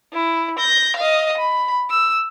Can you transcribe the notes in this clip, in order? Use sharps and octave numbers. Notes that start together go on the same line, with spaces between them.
E4
G6 A#6
D#5 F5
B5
E6